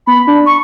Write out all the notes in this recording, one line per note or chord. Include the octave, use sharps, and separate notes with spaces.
B3 B5
D4
C#6